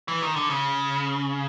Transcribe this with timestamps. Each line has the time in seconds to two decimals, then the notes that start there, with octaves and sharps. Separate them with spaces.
0.08 E3
0.23 D#3
0.36 D3
0.50 C#3